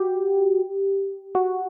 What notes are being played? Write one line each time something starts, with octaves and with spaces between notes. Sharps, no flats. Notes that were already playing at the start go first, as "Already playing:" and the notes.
Already playing: F#4 G4
F#4